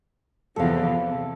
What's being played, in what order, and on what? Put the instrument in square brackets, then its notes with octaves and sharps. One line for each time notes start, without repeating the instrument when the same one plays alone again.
[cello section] E2 C3 F3 [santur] A4 F5
[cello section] C3